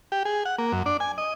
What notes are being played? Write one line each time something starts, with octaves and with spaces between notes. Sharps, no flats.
G4
G#4
F#5
A#3
F#2
D4
G#5
D#5